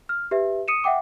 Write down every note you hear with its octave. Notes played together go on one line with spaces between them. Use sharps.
F6
G4 B4 E5
D#6 C#7 D#7 E7
E5 F#5 G5 D6